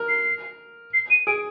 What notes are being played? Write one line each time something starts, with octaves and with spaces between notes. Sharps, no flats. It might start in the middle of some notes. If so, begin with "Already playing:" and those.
Already playing: A#4
C7
C7
D#7
G#4 D7